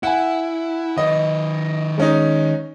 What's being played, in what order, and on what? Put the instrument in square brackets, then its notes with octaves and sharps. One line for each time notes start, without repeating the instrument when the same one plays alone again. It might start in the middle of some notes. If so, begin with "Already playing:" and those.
[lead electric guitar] E4 [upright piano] F#5 G#5
[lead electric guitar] D#3 B4 [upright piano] D#5
[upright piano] G#3 C#4 D#4